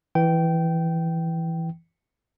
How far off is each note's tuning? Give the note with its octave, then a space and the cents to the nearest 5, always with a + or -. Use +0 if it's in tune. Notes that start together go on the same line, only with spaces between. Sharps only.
E3 +5 G5 -15